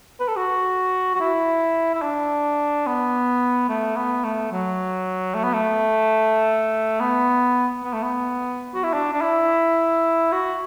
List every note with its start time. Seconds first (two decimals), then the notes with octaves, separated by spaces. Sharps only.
0.20 B4
0.28 A4
0.36 F#4
1.15 F#4
1.20 E4
1.94 E4
2.02 D4
2.86 B3
3.69 A3
3.96 B3
4.24 A3
4.52 F#3
5.35 A3
5.44 B3
5.53 A3
7.00 B3
7.83 B3
7.93 A3
8.02 B3
8.74 F#4
8.84 E4
8.93 D4
9.13 D4
9.21 E4
10.32 F#4